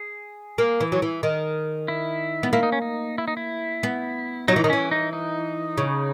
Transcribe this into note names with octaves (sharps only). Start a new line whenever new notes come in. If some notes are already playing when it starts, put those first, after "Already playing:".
Already playing: G#4
A#3
E3
F#3
E3
D#3
E4
B3
A#3 E4
D#4
C#4
D#4
E4
D#4
E4
B3
F#3 D#4
E3
D#3 D#4
E3 C#4
D#4
D#4
C#3